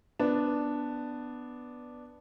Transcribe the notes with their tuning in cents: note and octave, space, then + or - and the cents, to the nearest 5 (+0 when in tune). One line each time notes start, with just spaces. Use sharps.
B3 +0 D4 +0